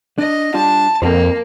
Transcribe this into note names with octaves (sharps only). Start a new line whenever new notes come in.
D4 D#5
G3 D4 F4 A5
F2 A#3 C4 A4 C5